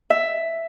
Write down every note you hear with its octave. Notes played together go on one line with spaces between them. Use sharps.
E5